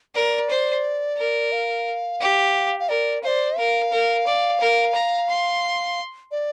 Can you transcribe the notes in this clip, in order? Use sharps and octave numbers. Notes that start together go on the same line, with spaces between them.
A#4 D5
C5
A#4
F5
G4
F5
A#4 D5
C5 D5 F5
A#4 F5
A#4
D5
A#4
A#5
C6
D5